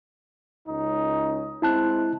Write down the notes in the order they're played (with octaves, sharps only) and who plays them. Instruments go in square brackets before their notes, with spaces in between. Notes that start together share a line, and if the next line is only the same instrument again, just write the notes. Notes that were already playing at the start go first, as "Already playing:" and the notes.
[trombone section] C#2 C#4 D#4
[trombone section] G#3 C4 [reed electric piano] E4 A5 F#6